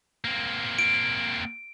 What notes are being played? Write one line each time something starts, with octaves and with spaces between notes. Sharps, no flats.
A#3 C4
D7